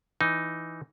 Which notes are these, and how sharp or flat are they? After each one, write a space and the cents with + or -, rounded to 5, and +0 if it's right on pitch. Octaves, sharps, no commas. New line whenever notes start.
E3 +0 D#4 +0